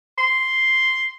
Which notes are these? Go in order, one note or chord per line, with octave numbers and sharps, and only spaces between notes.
C6